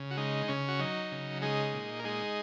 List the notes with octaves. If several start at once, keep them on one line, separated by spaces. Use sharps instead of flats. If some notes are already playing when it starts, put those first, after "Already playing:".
Already playing: C#3
F#4
G#3 D#4
C#3 C#4
F#4
F#3 D#4
C#3
G#3 D#4 G#4
A#2
A#4
G#3 D#4 G#4